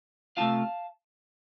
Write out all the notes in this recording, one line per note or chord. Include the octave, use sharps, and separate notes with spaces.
C3 A3 D4 F4 F5 A5